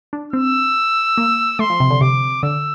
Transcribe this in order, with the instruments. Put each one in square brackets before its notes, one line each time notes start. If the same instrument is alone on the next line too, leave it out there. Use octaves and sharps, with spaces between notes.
[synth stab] D4
[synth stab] C4 [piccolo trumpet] E6
[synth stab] A#3
[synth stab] A3 [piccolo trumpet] C6
[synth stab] F3
C3
D3
[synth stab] C3 [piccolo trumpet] D6
[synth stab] D3 [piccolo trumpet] E6